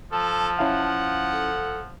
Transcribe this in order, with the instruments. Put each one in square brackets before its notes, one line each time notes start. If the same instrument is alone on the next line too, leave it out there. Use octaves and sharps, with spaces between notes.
[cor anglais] F3 [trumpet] A4 [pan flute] A5
[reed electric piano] C#4 E4 F5 [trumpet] F#5
[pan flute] A4